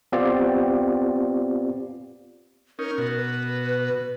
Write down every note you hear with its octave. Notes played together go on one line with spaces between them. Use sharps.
B3 C4 F4 G4 D5
C#4 D#4 A#4
B2 F#4
B4